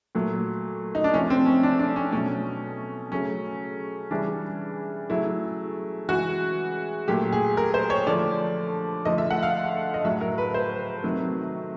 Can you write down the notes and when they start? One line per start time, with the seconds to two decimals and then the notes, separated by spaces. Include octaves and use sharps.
0.15 A#2 F#3 A3
0.95 D#4
1.04 D4
1.14 C3 F3 A3 C#4
1.30 C4
1.46 C#4
1.63 D4
1.79 D4
1.96 C#4
2.13 B2 F#3 A3 C#4
3.11 C#3 F#3 A3 C#4
4.11 C#3 E3 G3 D4
5.09 C#3 F#3 A3 E4
6.08 C#3 E3 G#3 F#4
7.08 A#2 F#3 A3 G4
7.33 G#4
7.57 A#4
7.74 C5
7.90 C#5
8.07 D3 F3 A3 D5
9.05 D3 F3 A3 D#5
9.18 E5
9.31 F#5
9.43 F5
9.94 D#5
10.05 A2 F#3 A3 E5
10.21 A#4
10.38 B4
10.54 C5
11.03 C3 D#3 F#3 A3